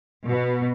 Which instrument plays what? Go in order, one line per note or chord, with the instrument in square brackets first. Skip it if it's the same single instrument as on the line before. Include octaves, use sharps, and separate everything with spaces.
[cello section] B2